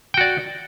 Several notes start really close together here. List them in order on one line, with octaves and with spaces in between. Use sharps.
G5 F#4 D5